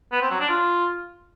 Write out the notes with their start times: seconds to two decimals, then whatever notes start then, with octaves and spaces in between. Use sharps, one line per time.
0.12 B3
0.22 C4
0.31 F#3
0.40 D4
0.49 F4